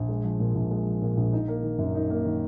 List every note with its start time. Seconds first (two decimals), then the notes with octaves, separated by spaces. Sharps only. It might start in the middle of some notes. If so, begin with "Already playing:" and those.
Already playing: A#1
0.09 G#3
0.24 F3
0.40 A#2
0.55 A#1
0.71 G#3
0.87 F3
1.02 A#2
1.17 A#1
1.33 D#4
1.48 A#3
1.63 D#3
1.78 F#2
1.95 D#4
2.10 A#3
2.25 D#3